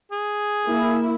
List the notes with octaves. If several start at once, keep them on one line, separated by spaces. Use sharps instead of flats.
G#4
A#3 E4